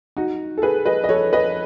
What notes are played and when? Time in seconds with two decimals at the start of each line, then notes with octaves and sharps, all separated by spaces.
0.17 D#4 F#4
0.58 A4
0.62 G#4 B4
0.86 B4 D#5
1.04 D#5
1.09 A4 C#5
1.33 B4 D#5